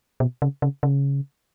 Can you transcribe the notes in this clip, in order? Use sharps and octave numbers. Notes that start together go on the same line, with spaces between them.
B2
C#3
C#3
C#3